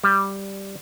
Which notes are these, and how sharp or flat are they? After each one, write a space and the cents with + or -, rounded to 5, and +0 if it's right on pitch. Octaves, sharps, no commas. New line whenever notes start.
G3 +0